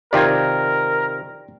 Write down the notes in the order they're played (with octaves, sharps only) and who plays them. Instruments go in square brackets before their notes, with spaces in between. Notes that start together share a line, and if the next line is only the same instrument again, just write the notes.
[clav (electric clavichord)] C3 D#3 F4 [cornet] A#4 [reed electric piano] D5 G5 G#6